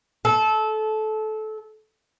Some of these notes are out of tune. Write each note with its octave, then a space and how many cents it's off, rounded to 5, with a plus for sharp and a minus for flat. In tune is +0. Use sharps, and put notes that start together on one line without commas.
A4 -20